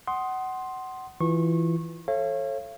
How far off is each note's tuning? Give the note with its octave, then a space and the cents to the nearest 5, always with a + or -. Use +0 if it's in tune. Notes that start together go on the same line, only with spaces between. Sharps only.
F#5 +25 C6 +5 D#6 +0
E3 +0 F4 +0 C#6 -30
A4 +0 C#5 -30 F5 -40